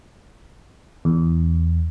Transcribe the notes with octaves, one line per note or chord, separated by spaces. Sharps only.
E2